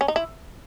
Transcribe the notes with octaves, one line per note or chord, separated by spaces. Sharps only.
C#4
D#4
E4